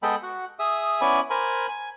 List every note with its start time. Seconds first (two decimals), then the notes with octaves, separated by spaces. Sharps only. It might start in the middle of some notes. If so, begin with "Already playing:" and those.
0.03 G#3 B3 A4 D#5 G5 B5
0.23 F#4 F#5
0.59 G#4 E5 D#6
1.01 B3 C#4 E4 D5 G#5 B5
1.30 A#4 C5 G#5 B5
1.68 G#5